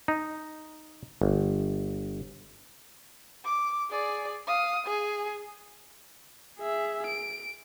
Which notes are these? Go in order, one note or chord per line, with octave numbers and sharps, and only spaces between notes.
D#4
G1
D6
G#4 D5
F5 D#6
G#4
G#4 E5
D7